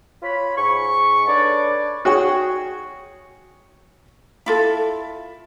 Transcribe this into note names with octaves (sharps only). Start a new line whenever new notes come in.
F4 C#5 B5
G#2 C#6
D4 A4 B4 C#5 D5
F#4 G#4 C#5 G5 C#6
E4 F4 A4